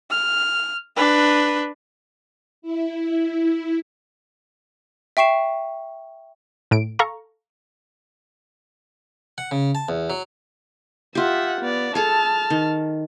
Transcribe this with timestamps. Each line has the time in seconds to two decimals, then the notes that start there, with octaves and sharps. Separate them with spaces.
0.10 F6
0.96 D4 B4
2.62 E4
5.17 E5 G5 C#6 C7 E7
6.71 A2 D7
6.99 A4 F5 A#5 C#6
9.38 F#5
9.51 C#3
9.75 A5
9.89 E2
10.10 F#3
11.15 F4 G4 E5 F#5
11.60 B3 D5
11.95 G#4 A4 A5 F6
12.50 D#3